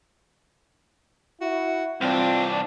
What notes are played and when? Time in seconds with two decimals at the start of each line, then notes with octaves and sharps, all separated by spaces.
1.41 E4 F#4
2.01 C2 C4 D4 F4